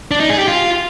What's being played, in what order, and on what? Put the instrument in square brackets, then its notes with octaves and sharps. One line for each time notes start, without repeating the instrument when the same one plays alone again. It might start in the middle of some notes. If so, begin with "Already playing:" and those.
[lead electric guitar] D4
D#4
G#4
G4
F4